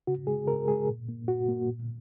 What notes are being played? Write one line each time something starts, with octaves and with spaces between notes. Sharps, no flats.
C#3 F#4
G#3 G#4
C#3 A#4
G#3 G#4
A#2
A#3
A#2 F#4
A#3
A#2